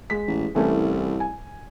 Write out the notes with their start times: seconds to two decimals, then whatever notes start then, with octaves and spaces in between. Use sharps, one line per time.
0.10 G#3 B6
0.27 A1
0.55 C2 E3 A3 C#4
1.20 G#5